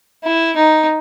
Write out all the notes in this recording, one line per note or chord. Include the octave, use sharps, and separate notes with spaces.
E4
D#4